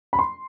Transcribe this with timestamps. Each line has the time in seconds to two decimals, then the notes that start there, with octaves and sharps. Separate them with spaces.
0.13 B5
0.19 C6